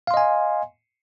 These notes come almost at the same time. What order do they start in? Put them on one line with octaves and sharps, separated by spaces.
F5 C6 D#5 G#5